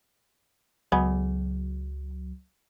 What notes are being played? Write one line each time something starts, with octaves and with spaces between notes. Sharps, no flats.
C#2 F#3 G#3 B3 G#4